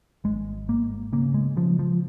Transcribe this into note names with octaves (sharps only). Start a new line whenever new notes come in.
G#1 G#3
G#2 A#3
C#3 A#3
G#3
C#3 F3
F3